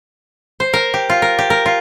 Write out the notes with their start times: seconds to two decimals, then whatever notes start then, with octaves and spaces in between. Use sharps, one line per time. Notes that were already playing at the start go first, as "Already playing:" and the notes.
0.60 C5
0.73 A#4
0.94 G4
1.10 F4
1.22 A#4
1.38 G4
1.50 A#4
1.66 F4